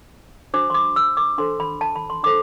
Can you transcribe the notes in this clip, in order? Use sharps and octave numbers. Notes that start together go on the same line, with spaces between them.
D4 F#4 C5 D6
C6
D6
E6
D6
D4 A4 C5 C6
B5
A5
B5
C6
D4 A4 C5 D6